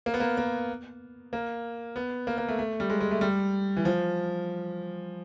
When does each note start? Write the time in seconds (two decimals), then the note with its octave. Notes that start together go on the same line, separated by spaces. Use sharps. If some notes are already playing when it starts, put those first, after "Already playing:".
0.06 A#3
0.14 B3
0.20 A#3
0.37 A#3
1.33 A#3
1.96 B3
2.27 A#3
2.38 A#3
2.49 A3
2.59 A3
2.80 G3
2.90 G#3
3.00 G#3
3.11 A3
3.21 G3
3.77 E3
3.85 F3